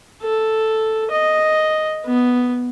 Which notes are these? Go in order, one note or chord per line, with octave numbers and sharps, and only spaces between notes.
A4
D#5
B3